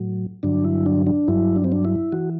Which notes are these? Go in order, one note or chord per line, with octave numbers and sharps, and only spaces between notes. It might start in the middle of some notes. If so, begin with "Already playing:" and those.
Already playing: A2 F#3
G2 D3 F#3 D4
E4
D4
D4
G2 F#3 E4
D4
C4
D4
E4
E3 F#4